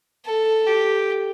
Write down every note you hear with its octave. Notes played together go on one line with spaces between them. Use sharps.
A4
G4